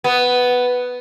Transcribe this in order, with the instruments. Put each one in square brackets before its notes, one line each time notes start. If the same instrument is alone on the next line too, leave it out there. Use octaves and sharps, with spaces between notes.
[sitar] B3